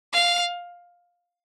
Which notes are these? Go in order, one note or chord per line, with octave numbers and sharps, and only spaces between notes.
F5